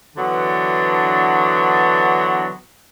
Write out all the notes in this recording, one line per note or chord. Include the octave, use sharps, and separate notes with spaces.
D3 E3 F#3 B3 D4